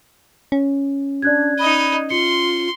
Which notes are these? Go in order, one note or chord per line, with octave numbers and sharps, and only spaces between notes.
C#4
D4 D5 F#6 G#6
D#4 D#5 B5
F4 C6 C#7